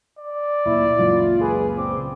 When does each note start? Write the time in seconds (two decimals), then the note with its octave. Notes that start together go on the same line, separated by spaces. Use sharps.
0.19 D5
0.65 D1 A#2 E4
0.99 C#2 F#2 A#2 F4
1.41 G#4 B4
1.78 C4 D6